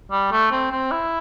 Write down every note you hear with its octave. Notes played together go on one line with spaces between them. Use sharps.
G3
A3
C4
C4
E4